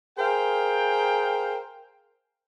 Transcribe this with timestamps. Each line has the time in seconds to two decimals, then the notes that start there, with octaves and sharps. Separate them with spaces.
0.18 G#4 A#4 C5 F5 G5